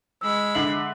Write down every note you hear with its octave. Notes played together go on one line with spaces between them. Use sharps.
G#3 B5 E6
D3 E5 C7 F#7